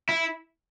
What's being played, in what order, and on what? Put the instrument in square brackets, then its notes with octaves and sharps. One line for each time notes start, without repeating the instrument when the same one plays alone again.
[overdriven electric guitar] E4